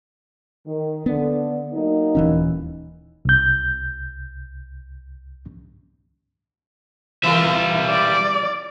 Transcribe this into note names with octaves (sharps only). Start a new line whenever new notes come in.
D#3
D3 B3
F#3 A#3 D#4
D#1 E3 C#4
C2 G6
E3 G3 F4 A#4 E5
D5